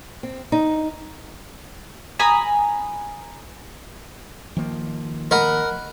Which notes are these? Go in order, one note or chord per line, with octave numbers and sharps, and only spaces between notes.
C4
D#4
G#5 A#5 B5 D#6
D#3 F3 A#3
A#4 D#5 F#5 B5